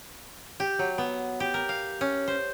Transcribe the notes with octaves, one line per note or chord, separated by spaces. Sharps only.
G4
F#3
B3
G4
A#4
F5
C#4
C5